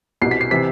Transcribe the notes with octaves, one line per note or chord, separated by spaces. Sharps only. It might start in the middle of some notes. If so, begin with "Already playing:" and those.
C2 B2 C7
B6
C7
C3 E3 B6